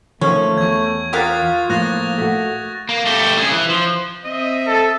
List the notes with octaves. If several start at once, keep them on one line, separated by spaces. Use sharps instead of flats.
D#3 F3 A3 A#3 C#4
E2 C#6 G#6
F4 G4 A#4 F5 D#6 F#6 A6
A2 F3 A#3 F#6 A#6 F7
A3 F#4
A#3
A3 G4
C#3 G#4
E3
F3
C4 D#5 E5
A4